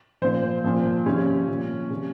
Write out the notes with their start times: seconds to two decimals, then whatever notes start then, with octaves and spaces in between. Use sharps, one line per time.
0.22 A#2 F3 C5
0.64 A#2 F3
1.06 C3 F3 C#4
1.48 A#2 F3
1.90 C3 F3